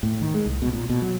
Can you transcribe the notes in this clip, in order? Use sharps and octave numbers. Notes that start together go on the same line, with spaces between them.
A2
D#3
G#3
C2
B2
A#2
B2
F#3